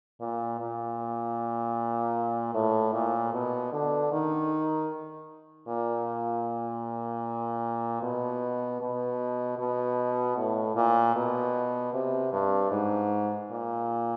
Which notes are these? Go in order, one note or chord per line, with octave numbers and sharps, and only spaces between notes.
A#2
A#2
A2
A#2
B2
D3
D#3
A#2
B2
B2
B2
A2
A#2
B2
C3
G2
G#2
A#2